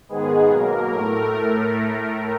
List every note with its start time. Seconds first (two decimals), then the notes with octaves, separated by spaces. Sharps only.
0.09 G#2 D#3 G#3 B3 G#4
0.50 B2 F#3 A#3 A#4
0.90 A2 A3